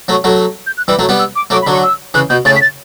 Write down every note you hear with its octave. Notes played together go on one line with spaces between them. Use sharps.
F#3 A3
F#3 A3
G6
F#6
E3 G3 E6
F#3 A3
G3 B3
E6
D6
F#3 A3 D6
B5
D3 F#3
C#6
E6
C#3 E3 F#6
B2 G6
A2 C#3 A6
B6
A6